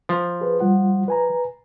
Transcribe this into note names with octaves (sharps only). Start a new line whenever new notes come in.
F3
G#4 B4
G3 F4 F#5
B4 G#5 A#5